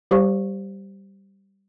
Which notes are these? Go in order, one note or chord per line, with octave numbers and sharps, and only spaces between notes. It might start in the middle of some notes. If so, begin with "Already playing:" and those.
G3 G4 C5 F5 C#6